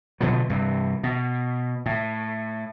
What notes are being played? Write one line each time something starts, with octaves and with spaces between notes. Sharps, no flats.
B2 D3 F3 F#3
G2 C3
B2
A2